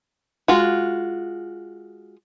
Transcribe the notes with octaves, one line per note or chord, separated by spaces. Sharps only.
G#3 F4 F#4